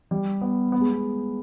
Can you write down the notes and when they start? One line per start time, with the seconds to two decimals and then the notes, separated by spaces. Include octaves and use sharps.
0.11 G3
0.41 B3
0.72 B3
0.81 G#3
0.89 B3